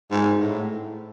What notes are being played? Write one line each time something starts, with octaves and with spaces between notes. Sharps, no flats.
G#2
A2